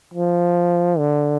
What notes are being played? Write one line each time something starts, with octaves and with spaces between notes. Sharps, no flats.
F3
D3